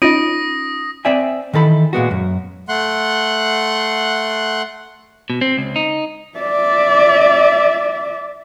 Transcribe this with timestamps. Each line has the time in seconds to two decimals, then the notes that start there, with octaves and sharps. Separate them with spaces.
0.02 C#4 D#4 F4 D#6 A#6 D7 D#7
1.05 C4 C5 D5 E5 G5 G#5
1.53 D#3 E3 A4 B5
1.93 A#2 G#3 B3 F#4
2.11 F#2
2.69 A3 F#5 C6 F#6
5.30 B2
5.41 C4
5.57 C#2
5.76 D#4
6.39 D5 E5